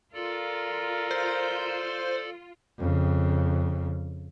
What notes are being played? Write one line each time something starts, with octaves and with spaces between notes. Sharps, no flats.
F4 A4 A#4 D5
C5
F2 C#3